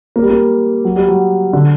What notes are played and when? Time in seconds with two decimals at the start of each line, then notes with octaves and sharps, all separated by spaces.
0.16 A#3
0.23 G3
0.30 A#3
0.85 F#3
0.96 G3
1.09 F#3
1.53 D3